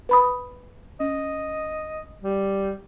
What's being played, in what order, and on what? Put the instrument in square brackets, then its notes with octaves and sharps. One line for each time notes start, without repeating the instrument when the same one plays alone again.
[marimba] B4 B5 D#6
[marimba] C#4 [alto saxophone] D#5
[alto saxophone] G3